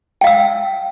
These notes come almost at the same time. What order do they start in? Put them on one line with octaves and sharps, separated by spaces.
G5 F5 E6